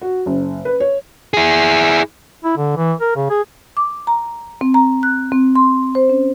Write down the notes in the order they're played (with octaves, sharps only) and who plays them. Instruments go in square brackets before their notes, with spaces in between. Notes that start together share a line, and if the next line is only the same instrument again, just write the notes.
[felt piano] F#4
F#1
B4
C#5
[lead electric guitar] E4 G#4
[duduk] E4
D3
E3
A#4
C#3
G#4
[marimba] D6
A#5
C4
A#5
F#6
C4
C6
C5
C#4